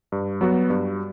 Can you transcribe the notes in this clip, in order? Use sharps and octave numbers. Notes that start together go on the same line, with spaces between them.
G2
F#3 B3 F#4
G2